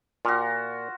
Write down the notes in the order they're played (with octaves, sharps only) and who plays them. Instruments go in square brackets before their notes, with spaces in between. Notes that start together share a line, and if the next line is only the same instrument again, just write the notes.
[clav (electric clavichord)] A#2 F5 [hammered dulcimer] F4 F#4